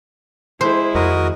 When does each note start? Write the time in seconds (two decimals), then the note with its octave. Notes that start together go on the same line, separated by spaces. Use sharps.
0.61 G#3 E4 C5
0.95 F2 D#3 F#4 A#4 D#5